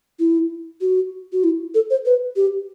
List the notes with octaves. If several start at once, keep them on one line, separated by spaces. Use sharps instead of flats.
E4
F#4
F#4
E4
A4
C5
B4
G4